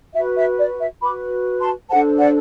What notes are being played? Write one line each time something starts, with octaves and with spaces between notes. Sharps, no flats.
F#4 B4 E5
E5
D5
E5
F#4 B4 B5 D6
A5 C6
D4 A4 C5 F#5 A5
D5 F#5